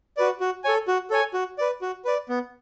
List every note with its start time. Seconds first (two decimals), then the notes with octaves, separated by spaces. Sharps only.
0.17 F#4 B4 D5
0.40 F#4
0.64 A4 C#5 G#5
0.88 F#4
1.10 A4 C#5 G#5
1.34 F#4
1.58 B4 D5
1.81 F#4
2.05 B4 D5
2.29 B3